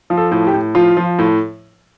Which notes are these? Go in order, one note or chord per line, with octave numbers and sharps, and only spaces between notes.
F3
A4
A2
G4
A2
F3 F4
F3
A2